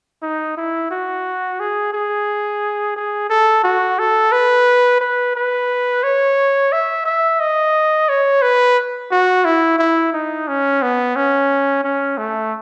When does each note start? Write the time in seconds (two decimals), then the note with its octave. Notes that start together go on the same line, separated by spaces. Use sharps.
0.23 D#4
0.57 E4
0.91 F#4
1.60 G#4
1.93 G#4
2.96 G#4
3.30 A4
3.64 F#4
3.99 A4
4.32 B4
5.01 B4
5.36 B4
6.03 C#5
6.72 E5
7.05 E5
7.40 D#5
8.09 C#5
8.42 B4
9.11 F#4
9.45 E4
9.79 E4
10.13 D#4
10.48 C#4
10.82 B3
11.16 C#4
11.84 C#4
12.18 A3